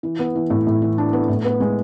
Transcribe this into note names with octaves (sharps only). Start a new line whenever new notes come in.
E3
B3
E3
A2
A2
E3
D4
B3
A2
B3
G#3